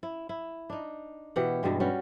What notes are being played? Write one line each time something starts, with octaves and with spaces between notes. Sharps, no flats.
E4
E4
D4 D#4
B2 E3 G4 F#5
G2 B2 G3 G#3
G3 C#4 F#4